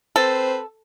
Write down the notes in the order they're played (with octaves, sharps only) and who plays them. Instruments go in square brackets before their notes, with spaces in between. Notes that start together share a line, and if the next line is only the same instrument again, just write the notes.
[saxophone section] C4 B4 C5 [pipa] A4